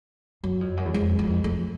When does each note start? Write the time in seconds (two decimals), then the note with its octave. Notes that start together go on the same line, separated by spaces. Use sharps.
0.44 F#2 F#3
0.61 F2
0.77 F#2
0.85 E2
0.93 F2 G#3
1.19 F2
1.44 F2 A3